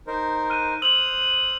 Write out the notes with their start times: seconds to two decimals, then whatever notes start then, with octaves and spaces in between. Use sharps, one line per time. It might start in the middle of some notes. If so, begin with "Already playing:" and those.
0.07 D#4 A#4 C5
0.50 F6 F#6 D#7
0.82 C5 D#6 E6 F7 F#7